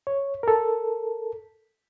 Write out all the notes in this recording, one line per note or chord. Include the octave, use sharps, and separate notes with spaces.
C#5
A4 A#4